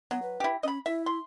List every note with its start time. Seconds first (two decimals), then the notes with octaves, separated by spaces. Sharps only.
0.11 F#3 B3
0.22 B4
0.40 E4 G4
0.63 C#4 D#5 B5
0.86 E4 E5
1.06 C6